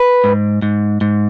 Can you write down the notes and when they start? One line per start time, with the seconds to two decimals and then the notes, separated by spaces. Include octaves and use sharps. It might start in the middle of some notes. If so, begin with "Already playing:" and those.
Already playing: B4
0.24 G#2
0.62 G#2
1.01 G#2